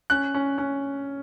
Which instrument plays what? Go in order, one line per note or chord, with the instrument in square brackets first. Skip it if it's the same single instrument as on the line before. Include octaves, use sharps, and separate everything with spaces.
[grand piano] C#4 F#6
C#4
C#4